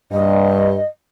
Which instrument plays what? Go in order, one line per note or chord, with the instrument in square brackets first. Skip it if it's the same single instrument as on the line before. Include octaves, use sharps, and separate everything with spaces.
[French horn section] G2 [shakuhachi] D#5